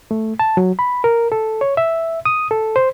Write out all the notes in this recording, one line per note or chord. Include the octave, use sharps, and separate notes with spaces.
A3
A5
F#3
B5
A#4
A4
C#5
E5
D#6
A4
C5